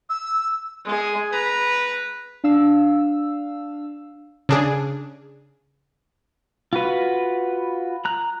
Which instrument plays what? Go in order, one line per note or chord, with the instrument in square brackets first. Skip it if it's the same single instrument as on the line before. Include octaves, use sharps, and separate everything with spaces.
[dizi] E6
[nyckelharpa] G#3 G#4
[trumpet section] B4 [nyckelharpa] A#5
[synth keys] D4 F5 E6
[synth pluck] C#3 D4 G#4
[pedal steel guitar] F4 F#4 B4
A#5 F#6